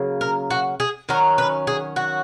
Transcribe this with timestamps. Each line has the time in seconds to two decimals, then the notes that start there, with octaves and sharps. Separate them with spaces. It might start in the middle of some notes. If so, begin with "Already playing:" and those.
Already playing: C#3 F#3 A#3
0.21 A#4
0.51 F#4
0.80 G#4
1.09 D#3 F#3 C#4 A#4
1.38 B4
1.67 G#4
1.96 F#4